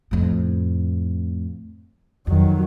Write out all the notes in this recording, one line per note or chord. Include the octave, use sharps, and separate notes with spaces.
F2 A2
F2 D#3 F#3